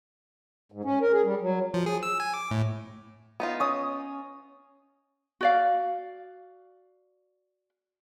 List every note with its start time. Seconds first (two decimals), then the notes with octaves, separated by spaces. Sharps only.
0.72 G#2
0.85 C#4
1.01 A#4
1.13 G#4
1.25 G3
1.41 F#3
1.74 F3
1.86 G#4
2.03 E6
2.20 G#5
2.34 D6
2.51 A2
3.40 B3 D#4 F4
3.60 C#4 D#6
5.41 F#4 D5 F5